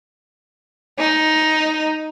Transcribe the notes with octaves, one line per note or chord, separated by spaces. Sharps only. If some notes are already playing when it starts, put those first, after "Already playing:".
D#4